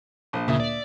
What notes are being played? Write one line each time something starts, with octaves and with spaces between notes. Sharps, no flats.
A#1
D2 A#2 C#3 A#3 E5 D#6
D5